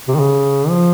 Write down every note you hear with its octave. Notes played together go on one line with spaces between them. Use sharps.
C3
D#3
C#3
F3